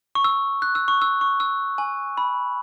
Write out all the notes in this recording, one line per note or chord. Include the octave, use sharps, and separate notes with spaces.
C#6
E6
F#6
E6
C#6
E6
C#6
E6
G#5
B5